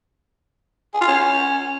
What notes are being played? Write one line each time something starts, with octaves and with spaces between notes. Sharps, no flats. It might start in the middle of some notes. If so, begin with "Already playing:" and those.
G#4
F4
C#4